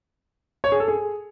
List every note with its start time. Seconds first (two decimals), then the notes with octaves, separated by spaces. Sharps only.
0.64 C#5
0.72 G#4
0.80 A4
0.88 G#4